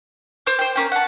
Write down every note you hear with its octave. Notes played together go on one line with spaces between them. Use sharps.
C5 D6 G6
C5 G5
A#3 C#4 G5
F#5 A5